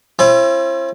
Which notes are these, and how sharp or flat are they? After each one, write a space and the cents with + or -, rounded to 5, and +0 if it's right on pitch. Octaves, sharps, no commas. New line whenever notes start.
C4 +40 E4 +45